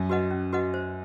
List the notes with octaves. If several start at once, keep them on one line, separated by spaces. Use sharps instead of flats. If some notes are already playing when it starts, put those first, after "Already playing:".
Already playing: F#2
F#4 B4 D#5 F#5
C#4
F#4 B4 D#5 F#5
C5